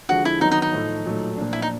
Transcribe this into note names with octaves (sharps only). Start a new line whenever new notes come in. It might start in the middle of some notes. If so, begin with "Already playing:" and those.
D3 F3 G#3 F#4
E4
D#3 F#3 B3 D#4
D#4
D#4
A2 F3 A3
A#2 F#3 A3
A#2 F3 A#3 D4
E4
D#4